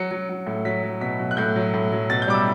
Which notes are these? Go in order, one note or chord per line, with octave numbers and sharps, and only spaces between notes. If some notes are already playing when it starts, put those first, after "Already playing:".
Already playing: F#3 C#7
F#3
F#3
A2
F#3 B6
F#3
B2 B6
F#3
F#6
A2 G6
F#3
A2
F#3
B2 A6
G6
G3 D6
E6